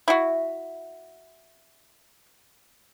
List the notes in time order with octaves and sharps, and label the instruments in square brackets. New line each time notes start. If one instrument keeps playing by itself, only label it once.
[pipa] E4 F#4